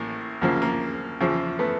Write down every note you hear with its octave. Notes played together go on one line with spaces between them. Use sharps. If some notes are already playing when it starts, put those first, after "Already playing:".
Already playing: A1 A2 A#3
D2 C#3 F3 A#3
A#3
E2 C#3 F3
A3 B3